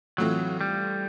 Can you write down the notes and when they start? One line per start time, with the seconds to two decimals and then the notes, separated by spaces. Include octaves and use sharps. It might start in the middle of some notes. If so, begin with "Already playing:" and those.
0.18 A2 E3 F#3 A3 C4 F4
0.61 G3